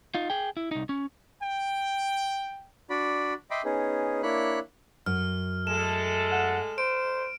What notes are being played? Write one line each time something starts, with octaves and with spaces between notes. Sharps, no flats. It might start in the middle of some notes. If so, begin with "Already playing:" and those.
D#4 F4
G#4 G5
E4
C2 D#4
C#4
G5
D4 F#4 D5 B5
D#5 E5 G5 B5 C6 D6
B3 C#4 D#4 G#4
A#3 D4 E4 C#5 B5 F#6
F#2 F6
G#3 A3 A4 E7
F#5
C5 D7